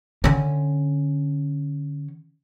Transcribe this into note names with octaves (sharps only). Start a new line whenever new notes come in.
D3 C#4